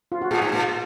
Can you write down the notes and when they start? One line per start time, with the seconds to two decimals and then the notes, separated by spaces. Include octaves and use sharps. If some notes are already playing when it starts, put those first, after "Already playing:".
0.12 F4
0.22 F#4
0.31 A#2 G#4
0.42 G#2
0.52 A#2